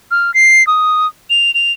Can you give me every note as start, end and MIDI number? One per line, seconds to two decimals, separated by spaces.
0.11 0.33 89
0.34 0.65 96
0.67 1.07 87
1.30 1.53 101
1.54 1.72 101